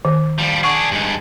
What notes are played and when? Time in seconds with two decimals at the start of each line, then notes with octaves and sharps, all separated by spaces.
0.05 D#3
0.39 F3 G3
0.64 D4 G#4 F#5 C#6
0.91 G2 G#3